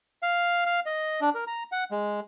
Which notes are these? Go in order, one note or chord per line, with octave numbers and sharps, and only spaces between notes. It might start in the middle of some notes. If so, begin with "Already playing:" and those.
F5
F5
D#5
D4
A#4
A#5
F#5
G#3